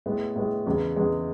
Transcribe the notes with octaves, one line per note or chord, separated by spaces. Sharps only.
A2 G#3 B3
A2 G#3 B3
E2 C#3 G#3
E2 C#3 G#3